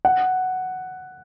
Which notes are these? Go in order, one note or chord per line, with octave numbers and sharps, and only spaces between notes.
F#5